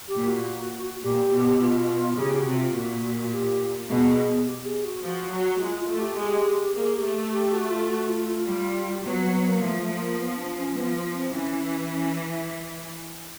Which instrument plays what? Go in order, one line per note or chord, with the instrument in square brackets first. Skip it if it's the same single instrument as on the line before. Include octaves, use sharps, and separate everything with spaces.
[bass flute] G4
[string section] A#2
[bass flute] F#4
[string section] A#2 [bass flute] G4
[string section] B2
[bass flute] F4
[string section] C#3 [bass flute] G4
[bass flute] F#4
[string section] C3
[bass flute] F4
[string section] A#2 [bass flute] F#4
[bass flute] G4
[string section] B2 [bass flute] G#4
[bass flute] G4
G#4
F#4
[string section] F3 [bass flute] F#4
[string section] F#3
[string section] G#3 [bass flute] F4
[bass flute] F4
[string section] A3
[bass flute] G4
[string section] G#3 [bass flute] G4
[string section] A#3 [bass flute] G#4
[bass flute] G4
[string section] A3
[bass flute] G4
F#4
F4
F#4
F4
F4
[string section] G3
[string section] F#3 [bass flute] B3
[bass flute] B3
B3
A#3
[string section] F3 [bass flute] A3
[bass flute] A3
A3
A#3
B3
D4
C#4
[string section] F3 [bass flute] B3
[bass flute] C4
[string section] E3 [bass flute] C#4
[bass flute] C#4